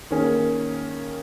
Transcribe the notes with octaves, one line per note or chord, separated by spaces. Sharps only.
D#3 A#3 C#4 G#4